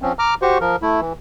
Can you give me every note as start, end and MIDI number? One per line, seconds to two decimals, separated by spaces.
0.02 0.13 53
0.02 0.13 60
0.02 0.13 61
0.19 0.34 82
0.19 0.34 86
0.19 0.34 89
0.42 0.58 66
0.42 0.58 67
0.42 0.58 72
0.42 0.58 85
0.60 0.76 53
0.60 0.76 70
0.82 1.00 57
0.82 1.00 64
1.01 1.13 52